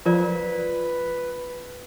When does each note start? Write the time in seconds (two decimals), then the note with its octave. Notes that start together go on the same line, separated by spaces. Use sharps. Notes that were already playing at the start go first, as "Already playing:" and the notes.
0.06 F3 F4 A#4 B4 D5